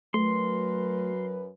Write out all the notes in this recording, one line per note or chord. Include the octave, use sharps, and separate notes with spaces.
F#2 F#3 A3 A#4 B4 C6